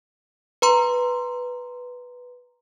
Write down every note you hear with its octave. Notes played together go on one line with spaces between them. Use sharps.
B4 A#5 C6